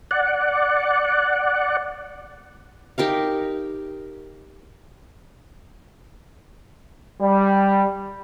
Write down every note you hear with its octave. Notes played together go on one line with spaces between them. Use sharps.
D5 F#5
D#4 G4 A#4 F5
G3